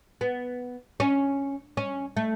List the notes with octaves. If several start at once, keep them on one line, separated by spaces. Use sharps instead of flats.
B3
C#4
C#4
A3